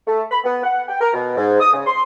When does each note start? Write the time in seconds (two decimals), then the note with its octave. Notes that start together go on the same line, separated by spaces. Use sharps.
0.07 A3
0.30 B5
0.44 B3
0.62 F#5
0.88 G5
1.00 A#4
1.13 B2
1.37 G#2
1.60 D#6
1.73 C#3
1.86 C6